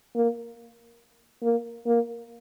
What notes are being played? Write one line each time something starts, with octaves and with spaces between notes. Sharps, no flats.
A#3
A#3
A#3